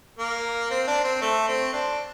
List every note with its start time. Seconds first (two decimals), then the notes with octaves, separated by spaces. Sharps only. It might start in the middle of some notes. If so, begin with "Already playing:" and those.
0.19 A#3
0.70 C4
0.87 D4
1.04 C4
1.21 A3
1.48 C4
1.73 D4